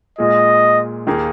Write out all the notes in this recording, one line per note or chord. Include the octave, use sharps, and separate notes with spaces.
A#2 G#3 F4 G#4 D#5
D#2 D#3 A#3 D#4 G#4